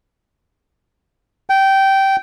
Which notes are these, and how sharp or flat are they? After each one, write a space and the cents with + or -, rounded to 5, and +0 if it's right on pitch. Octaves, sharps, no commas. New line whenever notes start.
G5 -15